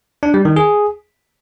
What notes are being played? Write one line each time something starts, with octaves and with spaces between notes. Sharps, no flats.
D4
G3
D#3
G#4